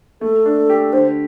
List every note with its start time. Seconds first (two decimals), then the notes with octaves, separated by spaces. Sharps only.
0.21 A3 A4
0.46 D4
0.70 G4
0.93 D3 C5